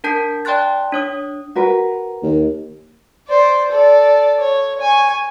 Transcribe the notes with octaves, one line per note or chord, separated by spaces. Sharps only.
D4 A#4 A5 G6 B6
D5 G5 A5 C6 F#6 A6
D4 C#5 D#6
F#4 A#4 B4
D#2
C5 D5
A4 D5
C#5
G#5 C#6